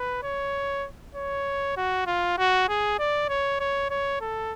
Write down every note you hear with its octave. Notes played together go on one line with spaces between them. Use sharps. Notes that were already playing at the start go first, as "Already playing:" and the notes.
Already playing: B4
C#5
C#5
F#4
F4
F#4
G#4
D5
C#5
C#5
C#5
A4